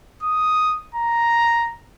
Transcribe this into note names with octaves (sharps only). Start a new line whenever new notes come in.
D#6
A#5